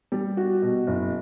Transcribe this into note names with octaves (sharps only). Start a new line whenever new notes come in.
G3
F#4
B2
F#1